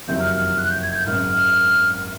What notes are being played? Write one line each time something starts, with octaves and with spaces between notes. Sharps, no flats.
F#1 F2 C3 D#3 F#3 G6
F6
F6
F6
F#6
G6
G#6
G6
G#1 F#2 C#3 F6